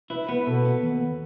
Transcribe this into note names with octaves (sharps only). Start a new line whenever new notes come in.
E4 B4
B3 B4
B2 A4
B3
D#2